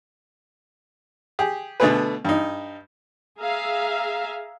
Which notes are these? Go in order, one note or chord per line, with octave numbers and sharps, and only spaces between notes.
G4 G#4
B2 D3 A3 B3 G#4 B4
G2 D#4
G#4 E5 F5 A#5